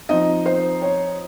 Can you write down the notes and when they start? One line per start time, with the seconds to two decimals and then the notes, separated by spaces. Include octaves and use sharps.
0.09 F3 C4 D#4 D#5
0.46 C5
0.82 C#5